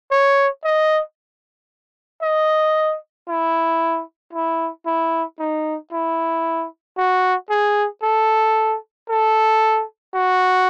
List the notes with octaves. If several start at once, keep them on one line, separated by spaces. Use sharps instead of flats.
C#5
D#5
D#5
E4
E4
E4
D#4
E4
F#4
G#4
A4
A4
F#4